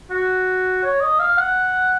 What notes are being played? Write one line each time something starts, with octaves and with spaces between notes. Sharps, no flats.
F#4
C#5
D#5
F5
F#5